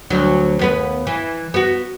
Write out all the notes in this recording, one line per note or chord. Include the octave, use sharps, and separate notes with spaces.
D2 F#3
D#2 B3 B4
E3
B3 F#4